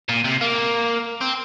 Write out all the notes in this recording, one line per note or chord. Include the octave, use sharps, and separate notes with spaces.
A#2
C3
A#3
C4